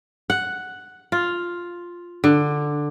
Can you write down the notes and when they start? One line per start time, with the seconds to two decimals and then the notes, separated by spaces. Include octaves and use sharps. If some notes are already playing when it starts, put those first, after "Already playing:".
0.30 F#5
1.12 F4
2.24 D3